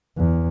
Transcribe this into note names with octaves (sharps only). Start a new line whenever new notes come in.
E2